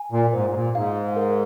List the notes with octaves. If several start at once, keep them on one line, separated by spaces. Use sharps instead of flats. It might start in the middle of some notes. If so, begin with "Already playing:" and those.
Already playing: G#5
A#2
G#2 C5
G#2
A#2
G#2 F5
A#4